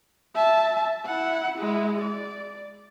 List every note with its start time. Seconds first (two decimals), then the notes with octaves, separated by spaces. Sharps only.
0.35 E5 A5
1.05 E4 F#5
1.58 G#3 E4
2.02 D5